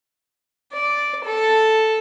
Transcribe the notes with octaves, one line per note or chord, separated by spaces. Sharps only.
D5
A4